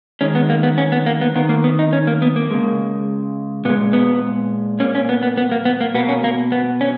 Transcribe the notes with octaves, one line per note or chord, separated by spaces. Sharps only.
D#3 G#3 C#4
B3
A#3
B3
C#4
B3
A#3
B3
D#3 A#3 B3
A#3
B3
D#4
C#4
A#3
B3
A#3
C#3 G#3
A#2 G#3 B3
B3
A#2 A#3 C#4
C#4
B3
B3
B3
A#3
B3
A#3
B2 A#3 B3
C#4
A#3
B3
C#4